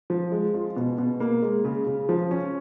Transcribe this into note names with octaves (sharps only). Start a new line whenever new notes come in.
F3
G#3
F4
B2
B2
A#3
G#3
C#3
C#3
F3
C#4